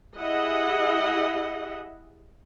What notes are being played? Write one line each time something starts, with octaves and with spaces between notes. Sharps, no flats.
E4 G4 G#4 D#5 E5 F#5